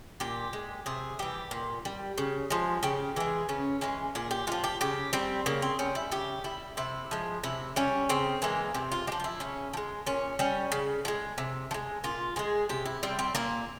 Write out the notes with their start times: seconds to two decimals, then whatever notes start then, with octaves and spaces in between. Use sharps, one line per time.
0.20 A#2 G4
0.53 G#3
0.86 C3 G#4
1.19 E3 G3 G4
1.51 A#2
1.85 G3
2.18 C#3
2.50 F3 G#3
2.83 C#3 G4
3.16 E3 G#3 G#4
3.49 C#3 C#4
3.81 E3 G#3 C#4
4.15 A#2 G#4
4.31 G4
4.47 F3 G#3 F4
4.64 G4
4.81 C#3 G4
5.13 G3 C4
5.46 C#3 A#3
5.62 C4
5.79 G3 C#4
5.95 E4
6.11 C#3 G4
6.44 G3 E4
6.77 C3 E4
7.11 F3 G#3
7.43 C3 E4
7.76 G3 C#4
8.09 C#3 C4
8.42 E3 G#3 A#3
8.74 C3 C4
8.92 F4
9.07 F3 G#3 G4
9.20 F4
9.24 E4
9.40 C#3 C#4
9.73 F3
9.77 G#3
10.06 A#2 C#4
10.39 G3 C#4
10.72 C#3
11.05 F3
11.08 G#3
11.38 C3
11.71 F3
11.74 G#3
12.04 A#2 F4
12.36 F3 G#3 G#4
12.69 C3 G4
12.86 E4
13.03 G3 C4
13.19 C4
13.35 A#2 A#3